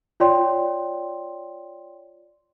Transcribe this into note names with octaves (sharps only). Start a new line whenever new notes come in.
F4 C#5 D5 G5 C6